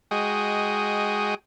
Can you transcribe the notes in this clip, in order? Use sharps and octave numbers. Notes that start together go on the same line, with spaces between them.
G#3 F#4 G#4 D#5 G5